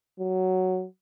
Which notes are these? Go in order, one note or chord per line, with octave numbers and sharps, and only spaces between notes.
F#3